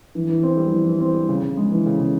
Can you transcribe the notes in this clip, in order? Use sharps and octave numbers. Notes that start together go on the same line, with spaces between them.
E3
E3
C4
G3
E3
E3
C4
G3
C#3
C#3
G#3
E3
C#3
C#3